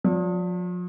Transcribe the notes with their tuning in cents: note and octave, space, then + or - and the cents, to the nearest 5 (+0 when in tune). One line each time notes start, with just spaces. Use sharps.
F3 +40 D5 -25